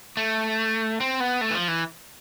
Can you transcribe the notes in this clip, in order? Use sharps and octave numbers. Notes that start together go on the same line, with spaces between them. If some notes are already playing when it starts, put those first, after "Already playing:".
A3
C4
B3
A3
E3
F3
E3